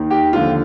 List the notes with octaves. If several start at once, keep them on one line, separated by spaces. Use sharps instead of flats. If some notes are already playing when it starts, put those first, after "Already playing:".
Already playing: D#2 D#3
G4
D#2 D3 F3 F4